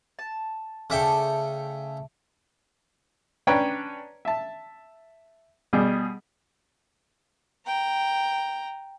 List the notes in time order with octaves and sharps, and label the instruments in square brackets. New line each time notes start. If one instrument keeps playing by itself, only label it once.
[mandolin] A5
[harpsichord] C#3 E5 G5 [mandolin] A3 A4 D5
[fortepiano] C#4 D4 B4 C#5 G5 A#5
E5 A5
B2 G3 G#4
[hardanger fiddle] G5 A#5